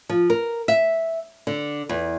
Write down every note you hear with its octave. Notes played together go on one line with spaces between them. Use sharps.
F3
A#4
E5
D3
E2